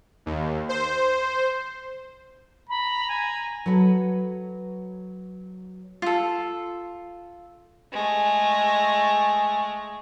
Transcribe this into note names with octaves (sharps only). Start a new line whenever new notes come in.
D#2
C5
A#5 B5
G#5
F#3 F#4 A4 B4
F4 A4
G#3 A3